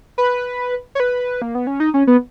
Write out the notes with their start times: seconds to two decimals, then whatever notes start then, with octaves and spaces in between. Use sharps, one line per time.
0.18 B4
0.95 C#5
1.00 B4
1.42 A#3
1.55 B3
1.67 C#4
1.80 D#4
1.94 C#4
2.07 B3